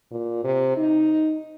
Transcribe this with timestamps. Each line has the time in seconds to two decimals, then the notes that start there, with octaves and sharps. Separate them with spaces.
0.11 A#2
0.44 C3
0.77 D#4